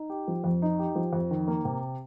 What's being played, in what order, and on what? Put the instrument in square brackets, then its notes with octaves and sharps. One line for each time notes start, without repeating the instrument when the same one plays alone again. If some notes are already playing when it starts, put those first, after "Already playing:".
Already playing: [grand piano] D#4
G4
F3
F2
D#4
G4
F3
F2
D#3
A#3
C3